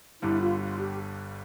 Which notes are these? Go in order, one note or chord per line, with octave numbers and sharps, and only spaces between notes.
G1 G2 D3 G3 E4
F4
F4
G4